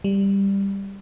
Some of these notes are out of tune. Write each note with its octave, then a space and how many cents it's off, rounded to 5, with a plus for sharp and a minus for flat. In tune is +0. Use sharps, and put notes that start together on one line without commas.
G3 +10